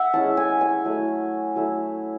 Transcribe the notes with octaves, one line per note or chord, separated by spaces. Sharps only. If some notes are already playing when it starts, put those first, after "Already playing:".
Already playing: E5 F#5
G#3 C#4 E4 A5
G#5
G#5
F#3 A3 E4
F#3 A3 E4